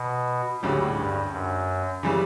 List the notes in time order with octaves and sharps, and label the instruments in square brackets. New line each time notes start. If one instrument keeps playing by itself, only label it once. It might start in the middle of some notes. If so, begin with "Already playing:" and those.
Already playing: [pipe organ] B2
[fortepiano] D2 C#3 G3 [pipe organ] A2
[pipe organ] G2
F#2
[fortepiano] C#3 E3 G3